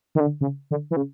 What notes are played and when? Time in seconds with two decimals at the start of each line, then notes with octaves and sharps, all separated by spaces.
0.15 D#3
0.20 D3
0.41 C#3
0.71 D3
0.91 E3
0.97 C#3